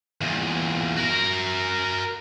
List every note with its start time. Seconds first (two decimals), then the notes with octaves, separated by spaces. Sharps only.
0.21 E2 A#2
0.97 F#4 A#4